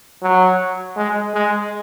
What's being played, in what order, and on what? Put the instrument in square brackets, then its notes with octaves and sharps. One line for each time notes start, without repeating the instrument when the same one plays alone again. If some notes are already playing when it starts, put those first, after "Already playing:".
[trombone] F#3
G#3
G#3